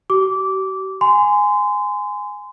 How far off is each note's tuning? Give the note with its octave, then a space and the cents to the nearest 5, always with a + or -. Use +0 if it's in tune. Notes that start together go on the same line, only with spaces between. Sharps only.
G4 -45 D6 -15
G#5 +0 C6 -30